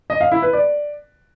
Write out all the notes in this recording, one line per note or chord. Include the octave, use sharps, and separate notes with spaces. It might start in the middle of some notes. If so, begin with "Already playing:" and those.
D#5
F5
E4
B4
D5